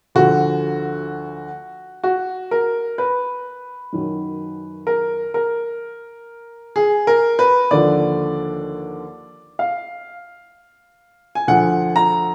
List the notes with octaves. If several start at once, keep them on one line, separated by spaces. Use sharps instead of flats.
D2 D3 F3 F#4
F#4
A#4
B4
F#2 D#3 F#3
A#4
A#4
G#4
A#4
B4
D#2 D3 F3 D5
F5
G#5
D2 D3 F3 F#5
A#5